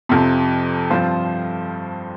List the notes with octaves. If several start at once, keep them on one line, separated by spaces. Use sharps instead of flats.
F2 C3 F3
G2 F3 C4 F4 C5